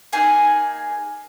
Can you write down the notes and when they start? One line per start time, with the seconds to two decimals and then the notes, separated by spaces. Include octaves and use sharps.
0.13 A#3 D#4 G#4 G#5